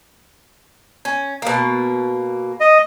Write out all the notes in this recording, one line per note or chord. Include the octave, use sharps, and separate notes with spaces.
C#4
B2 A#3
D#5